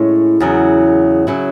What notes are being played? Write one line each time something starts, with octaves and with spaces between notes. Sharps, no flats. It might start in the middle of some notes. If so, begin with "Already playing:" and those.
Already playing: A2 G#3 C#4
E2 C#3 F#3
C#3 F#3 C#4 E4